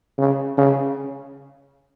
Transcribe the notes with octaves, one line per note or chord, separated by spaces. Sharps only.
C#3
C#3